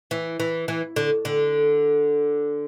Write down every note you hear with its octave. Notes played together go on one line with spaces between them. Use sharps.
E3
E3
E3
D3
D3